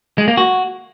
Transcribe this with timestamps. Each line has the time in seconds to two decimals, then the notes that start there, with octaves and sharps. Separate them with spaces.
0.18 G#3
0.28 A#3
0.37 F#4